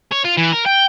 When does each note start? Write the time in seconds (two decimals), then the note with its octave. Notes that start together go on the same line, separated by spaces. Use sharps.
0.12 C#5
0.25 F4
0.38 E3
0.53 A#4
0.66 G5